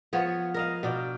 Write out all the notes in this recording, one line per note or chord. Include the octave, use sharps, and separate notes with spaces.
F3 B3 C#5
A#4 D#5 F5
B2 D4 G5